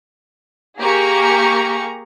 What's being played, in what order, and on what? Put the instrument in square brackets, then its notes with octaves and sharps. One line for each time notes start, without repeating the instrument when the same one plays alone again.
[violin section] A#3 G4 G#4 A#5 C#6